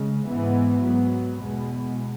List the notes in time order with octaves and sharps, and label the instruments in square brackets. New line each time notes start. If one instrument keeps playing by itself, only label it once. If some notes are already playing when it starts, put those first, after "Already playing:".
Already playing: [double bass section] C#3 G#3
G#2 E3 B3
G#2 F#3 B3
E2 B2 G#3 B3